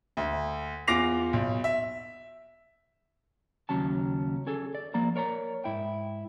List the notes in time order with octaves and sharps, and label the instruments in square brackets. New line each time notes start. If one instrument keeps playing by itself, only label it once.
[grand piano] D2
E2 F4 D6 A#6 C7 F7
B1
E5
[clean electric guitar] D#2 C#3 F#3 C#4 A5
C#4 G#4 A4
D5
F3 A#3 D5 A#5
A#4 C#5 D5 A#5
G#2 E4 G5